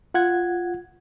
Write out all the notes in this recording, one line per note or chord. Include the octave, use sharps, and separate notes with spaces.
F4 F#5 G#6